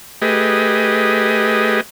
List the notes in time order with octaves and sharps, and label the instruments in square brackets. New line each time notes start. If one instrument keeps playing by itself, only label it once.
[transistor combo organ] A3 G4 G#4 B4 D#5